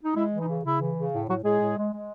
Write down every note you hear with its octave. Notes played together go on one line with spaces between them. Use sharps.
D#4
G#3 E4
E3
D#4
C#3
C#3 E4
E3
C#3
A2
A2 F#3 F#4
A2 G#3 G#4
A2
G#3
G#3